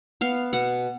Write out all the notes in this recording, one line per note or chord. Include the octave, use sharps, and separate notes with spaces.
B3 F5
B2 F#5